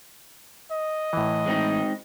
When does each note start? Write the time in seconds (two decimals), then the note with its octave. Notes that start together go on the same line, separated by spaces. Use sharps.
0.72 D#5
1.13 A2 E3
1.46 G#3 C4 D#4